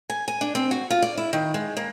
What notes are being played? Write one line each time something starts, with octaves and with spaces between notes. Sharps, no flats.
G#5
G#5
D4
C4
F#4
F4
D5
E4
D#3
G#3
A#3